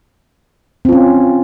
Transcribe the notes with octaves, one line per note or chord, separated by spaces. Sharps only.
C4 C#4 F4